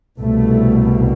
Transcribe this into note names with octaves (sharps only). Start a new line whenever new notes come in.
C2 B2 A3